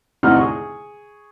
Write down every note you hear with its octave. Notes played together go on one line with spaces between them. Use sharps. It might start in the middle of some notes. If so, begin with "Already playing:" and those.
E2 A2 C3 D#4 F#5 F6
G#4 C#6